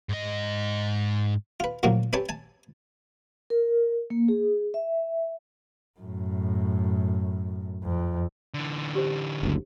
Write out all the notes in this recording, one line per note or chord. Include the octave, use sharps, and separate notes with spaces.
G#2 D#5
F4 B4
D2 A#2 F3 F#3 A#3
C4 G4 B4 C#5 G#5 A5
G#5 A5
A#4
A#3
G#4
E5
F#2 A2
F2
D3 E3
G4 C5
F#1 D2